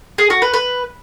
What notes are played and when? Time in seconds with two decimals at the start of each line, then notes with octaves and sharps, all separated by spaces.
0.18 G#4
0.30 F#4
0.42 B4
0.54 B4